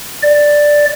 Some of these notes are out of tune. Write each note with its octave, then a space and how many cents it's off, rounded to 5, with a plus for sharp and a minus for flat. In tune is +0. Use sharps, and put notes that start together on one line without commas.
D5 +5